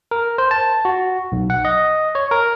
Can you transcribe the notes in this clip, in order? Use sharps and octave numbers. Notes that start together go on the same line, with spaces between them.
A#4
C5
A5
F#4
B1
F#5
D#5
C#5
A#4